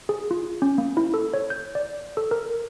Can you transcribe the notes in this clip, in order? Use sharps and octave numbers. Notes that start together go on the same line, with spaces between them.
G#4
F4
C#4
A#3
E4
A4
C#5
G6
D5
A4
A#4